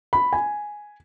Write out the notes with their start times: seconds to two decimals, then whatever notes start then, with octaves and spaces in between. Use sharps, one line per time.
0.13 B5
0.33 G#5